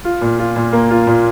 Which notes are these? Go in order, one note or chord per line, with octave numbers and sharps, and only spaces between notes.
F4
A#2
F4
A#2
A#3
F4
A#2